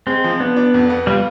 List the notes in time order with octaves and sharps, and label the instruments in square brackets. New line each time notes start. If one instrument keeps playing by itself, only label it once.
[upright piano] G#3 [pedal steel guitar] C4
[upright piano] F3
[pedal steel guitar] B3 [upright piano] D4
[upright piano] D4
F2
B3
[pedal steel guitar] G3 [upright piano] F4